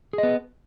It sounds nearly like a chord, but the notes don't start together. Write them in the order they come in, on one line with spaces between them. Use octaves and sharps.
G#4 D#5 B3